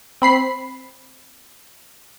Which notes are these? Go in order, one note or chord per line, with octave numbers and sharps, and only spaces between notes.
C4 B5 C7